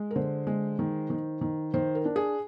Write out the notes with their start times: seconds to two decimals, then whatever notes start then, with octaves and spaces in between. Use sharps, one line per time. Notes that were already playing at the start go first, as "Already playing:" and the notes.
Already playing: G#3
0.11 A#4
0.15 D3 C5
0.47 G#3
0.79 D#3
1.10 D#3
1.41 D#3
1.74 D#3 C5
1.95 A#4
2.05 D4
2.16 G#4